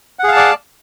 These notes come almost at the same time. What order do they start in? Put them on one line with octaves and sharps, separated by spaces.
F#5 G#4 F5 A5 D5